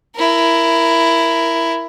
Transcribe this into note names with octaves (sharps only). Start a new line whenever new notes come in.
E4 A#4